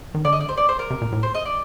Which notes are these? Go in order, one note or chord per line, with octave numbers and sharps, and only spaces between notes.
D#3
D3 D5
D#5
D5
C5
D5
C5
A#4
C3
A#2
A2
C5
D#5
D5